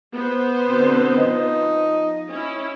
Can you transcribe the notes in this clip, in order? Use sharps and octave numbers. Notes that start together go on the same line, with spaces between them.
B3 C5
B2 D3 C4
F3 D#4 D#5
C#4 E4